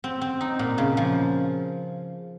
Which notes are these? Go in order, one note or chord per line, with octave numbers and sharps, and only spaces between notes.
C4
C4
D#4
A#2
C#3
F3